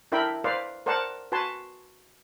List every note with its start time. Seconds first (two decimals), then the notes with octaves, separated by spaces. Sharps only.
0.12 D4 E4 A#4 E5 G5 B5
0.44 B4 C5 D5 F5
0.86 A#4 C5 D5 F#5 A5
1.32 F#4 B4 G#5 A5 C6